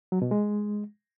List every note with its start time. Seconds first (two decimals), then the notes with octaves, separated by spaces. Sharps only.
0.12 F#3
0.22 B2
0.31 G#3